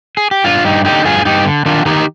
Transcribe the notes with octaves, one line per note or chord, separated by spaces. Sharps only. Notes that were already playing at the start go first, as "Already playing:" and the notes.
G#4
G4
G2 D4 F4
G2 D#4 G4
D3 D#4 G4
G2 F4 G#4
F4
G2 D#4 G4
D3
D#3 D4 F4
D#3 D#4 G4